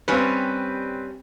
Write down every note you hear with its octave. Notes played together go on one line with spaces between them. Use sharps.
G2 G3 C4 C#4 B4